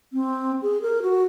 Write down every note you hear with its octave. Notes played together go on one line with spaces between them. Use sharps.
C4
G#4
A#4
F#4